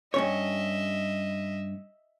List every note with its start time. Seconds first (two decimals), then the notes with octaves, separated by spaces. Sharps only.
0.14 G2 C#4 C#5 D#5 E5